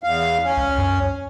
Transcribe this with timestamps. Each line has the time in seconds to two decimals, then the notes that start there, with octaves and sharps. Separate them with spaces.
0.04 E2 F5
0.45 C#4
0.57 C#2
0.78 F#2